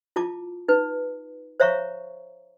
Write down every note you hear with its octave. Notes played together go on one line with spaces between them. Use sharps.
E4 F4 A5 D6
D#4 B4
C5 C#5 E5 F5 A#5 C#6